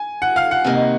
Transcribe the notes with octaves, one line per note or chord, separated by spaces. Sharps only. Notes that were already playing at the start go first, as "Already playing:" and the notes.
Already playing: G#5
F#5
F5
F#5
C3 D#3 A#3 D#4